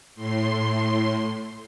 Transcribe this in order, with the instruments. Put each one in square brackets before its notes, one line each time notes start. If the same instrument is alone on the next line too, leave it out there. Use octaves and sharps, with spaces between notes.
[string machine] A2 C6